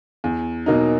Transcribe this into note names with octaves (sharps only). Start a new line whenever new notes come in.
E2
B2 F#3 A#3 D#4